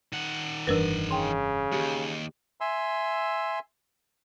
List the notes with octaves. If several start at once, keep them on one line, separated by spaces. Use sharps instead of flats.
D#3 F#5
F1 G2 E3 D4 A#4 B4
C#3 G5 C6
D#2 G#2 G4
E5 G#5 C6 E6